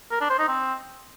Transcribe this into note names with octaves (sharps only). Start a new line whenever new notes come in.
A#4
D4
C5
D#4
C4